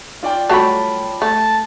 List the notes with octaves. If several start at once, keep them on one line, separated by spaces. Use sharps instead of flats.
F4 D5 G5
F#3 G3 A3 A5 B5
A3 A5